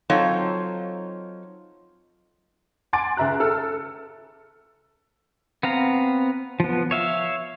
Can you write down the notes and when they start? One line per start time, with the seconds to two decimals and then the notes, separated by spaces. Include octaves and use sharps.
0.10 F#3 C4 D#4 F4 A4 C#5
2.93 F#5 G#5 C6 D6 A6 D7
3.17 C#2 E5 A#5 F#6
3.40 A4 E6 F6
5.63 B3 C4 F5 A#5
6.60 F3 B3
6.91 C#5 E5 F5